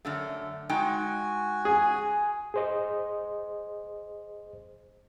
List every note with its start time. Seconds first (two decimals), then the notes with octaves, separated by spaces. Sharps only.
0.05 F#2 D3 A3
0.69 G#3 D#4 F#4 G5 G#5
1.65 G#4
2.54 G#4 C5 D#5